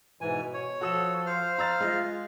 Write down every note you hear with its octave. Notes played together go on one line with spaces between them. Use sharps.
G#2 B2 E3 G#5
C#5
F3 F#4 A4 D#6 E7
C5 F5 F6
A#5 E6 A6
G#3 F4 D#5